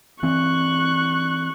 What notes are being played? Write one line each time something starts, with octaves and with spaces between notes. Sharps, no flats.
E3 C4 C#6 F#6